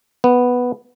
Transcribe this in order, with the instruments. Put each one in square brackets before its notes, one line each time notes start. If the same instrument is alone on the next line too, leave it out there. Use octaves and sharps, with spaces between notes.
[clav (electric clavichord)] B3